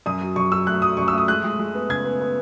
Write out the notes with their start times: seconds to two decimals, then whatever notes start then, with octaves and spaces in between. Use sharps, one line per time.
0.06 F#2 D#6
0.21 F#3
0.36 F#2 C#6
0.52 F#3 E6
0.67 A3 F#6
0.82 F#3 D#6
0.97 F#2 C#6
1.08 E6
1.13 A3 D#6
1.28 G#3 F#6
1.44 G#3
1.59 G#3
1.75 B3
1.89 C#3 G#6
2.05 B3
2.20 B3